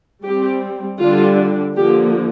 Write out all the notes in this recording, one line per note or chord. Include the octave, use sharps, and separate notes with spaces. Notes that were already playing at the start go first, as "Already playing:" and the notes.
G3 C4 G4
D3 G3 D4 F4
D3 F3 A#3 G4